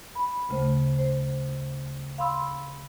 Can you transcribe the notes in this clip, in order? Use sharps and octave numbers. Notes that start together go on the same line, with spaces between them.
B5
D2 C#3 A3 C5
C5
F5 B5 C6 E6